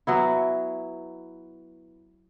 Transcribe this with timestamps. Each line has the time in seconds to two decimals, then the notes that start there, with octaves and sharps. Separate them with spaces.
0.07 F#3 B3 E4